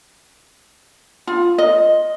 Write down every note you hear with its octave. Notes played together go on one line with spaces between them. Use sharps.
F4
D#5